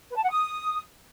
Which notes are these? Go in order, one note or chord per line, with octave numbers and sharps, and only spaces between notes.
B4
A5
F#5
D#6